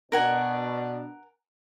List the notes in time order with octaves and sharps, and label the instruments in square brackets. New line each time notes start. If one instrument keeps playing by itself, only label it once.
[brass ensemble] B2 D4 [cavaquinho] A#4 F#5 G#5